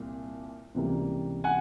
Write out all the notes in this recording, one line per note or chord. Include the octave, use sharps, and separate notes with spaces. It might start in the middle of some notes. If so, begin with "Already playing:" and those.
Already playing: C2 A#2
C#2 C3 E3 G3 A#3
F#5 G#5